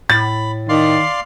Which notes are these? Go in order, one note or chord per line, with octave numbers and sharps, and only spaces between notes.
A2 B5 A6
D#3 D5 F5 C6